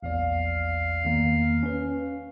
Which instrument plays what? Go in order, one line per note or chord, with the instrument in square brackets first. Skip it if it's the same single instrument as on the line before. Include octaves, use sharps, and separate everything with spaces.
[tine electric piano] A#1 E2 D5 [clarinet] F5
[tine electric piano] E2 D#3 A#3
C#4 B4